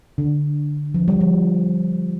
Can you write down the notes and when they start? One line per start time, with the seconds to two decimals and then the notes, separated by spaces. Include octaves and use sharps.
0.18 D3
0.94 F3
1.08 G3
1.20 F3